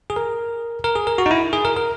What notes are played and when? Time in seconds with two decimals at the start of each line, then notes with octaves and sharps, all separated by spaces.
0.10 G#4
0.16 A#4
0.84 A#4
0.96 G#4
1.07 A#4
1.18 F#4
1.26 D#4
1.31 E4
1.53 G#4
1.65 A#4
1.76 A#4